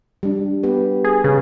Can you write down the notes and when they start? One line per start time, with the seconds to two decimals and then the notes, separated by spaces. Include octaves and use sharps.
0.23 G3 D4
0.63 B3 G4 B4
1.04 G#4
1.24 C#3 B4